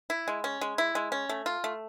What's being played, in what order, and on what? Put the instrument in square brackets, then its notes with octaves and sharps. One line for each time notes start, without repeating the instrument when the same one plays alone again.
[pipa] E4
G#3
C#4
G#3
E4
G#3
C#4
A3
F4
A3